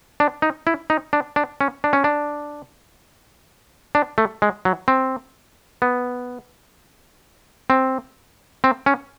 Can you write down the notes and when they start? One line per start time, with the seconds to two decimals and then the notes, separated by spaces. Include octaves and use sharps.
0.20 D4
0.42 D#4
0.67 E4
0.90 D#4
1.13 D4
1.36 D4
1.61 C#4
1.84 D4
1.93 C#4
2.04 D4
3.95 D4
4.18 A3
4.42 G#3
4.65 F#3
4.88 C4
5.82 B3
7.70 C4
8.64 C4
8.86 C#4